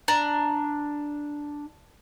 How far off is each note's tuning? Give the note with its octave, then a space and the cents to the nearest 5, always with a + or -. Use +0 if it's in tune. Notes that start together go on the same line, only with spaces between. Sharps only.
D4 +0 A#5 +0